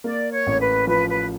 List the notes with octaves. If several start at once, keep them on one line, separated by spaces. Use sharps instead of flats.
A#3 D5
C#5
A1
B4
F3 B4
B4